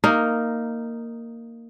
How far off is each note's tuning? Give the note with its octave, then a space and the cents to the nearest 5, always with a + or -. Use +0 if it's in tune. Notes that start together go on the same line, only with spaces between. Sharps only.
A#3 -10 D#4 +0